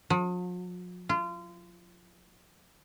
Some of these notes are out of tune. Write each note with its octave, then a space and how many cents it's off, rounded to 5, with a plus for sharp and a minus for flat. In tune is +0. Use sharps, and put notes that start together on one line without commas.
F3 +45
F4 -30